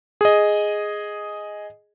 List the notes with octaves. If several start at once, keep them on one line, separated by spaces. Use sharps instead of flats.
G#4 D#5